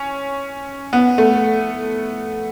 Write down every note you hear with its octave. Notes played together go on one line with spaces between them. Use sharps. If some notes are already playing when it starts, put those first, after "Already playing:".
Already playing: C#4
B3
A3